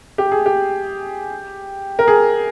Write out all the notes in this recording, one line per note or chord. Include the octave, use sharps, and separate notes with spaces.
G4
G#4
G4
A#4
G#4